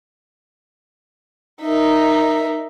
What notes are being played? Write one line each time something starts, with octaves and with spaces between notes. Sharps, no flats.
D#4 A#4 E5